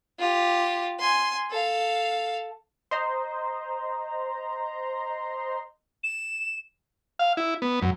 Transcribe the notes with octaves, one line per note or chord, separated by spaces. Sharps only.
F4 G4
G#5 C6
A4 F5
C5 D#5 A#5 C6
E7
F5
E4
B3
F#2